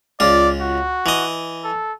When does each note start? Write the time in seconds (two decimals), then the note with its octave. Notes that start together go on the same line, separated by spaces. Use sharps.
0.20 C#2 F4 D5
0.61 F#4
1.06 E3 D#5
1.64 A4